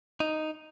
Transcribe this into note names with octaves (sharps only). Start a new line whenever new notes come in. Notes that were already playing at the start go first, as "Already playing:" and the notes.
D#4